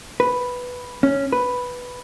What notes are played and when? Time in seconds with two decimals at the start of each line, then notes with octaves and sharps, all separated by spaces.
0.20 B4
1.03 C#4
1.32 B4